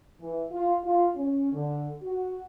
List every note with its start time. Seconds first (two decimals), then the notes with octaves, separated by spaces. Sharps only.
0.21 E3
0.51 F4
0.84 F4
1.16 C#4
1.52 D3
2.03 F#4